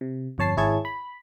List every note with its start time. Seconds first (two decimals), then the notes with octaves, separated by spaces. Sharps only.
0.01 C3
0.38 G1 F2 C#5 A5 C7
0.57 G#1 E4 G#4 C#5 A5 G#6
0.85 B5